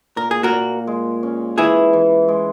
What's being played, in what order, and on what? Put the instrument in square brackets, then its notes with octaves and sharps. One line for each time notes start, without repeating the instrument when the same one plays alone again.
[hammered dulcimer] A#2 [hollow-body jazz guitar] A#4
[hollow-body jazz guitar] G#4
F#4 A#4
[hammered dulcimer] A#2
G#3
C#4
[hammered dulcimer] E3 [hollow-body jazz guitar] E4 G#4
[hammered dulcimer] E3
G#3